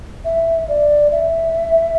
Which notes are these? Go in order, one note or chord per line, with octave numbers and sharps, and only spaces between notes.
E5
D5
E5